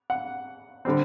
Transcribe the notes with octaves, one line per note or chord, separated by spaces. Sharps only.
F#5
D3 G3 C4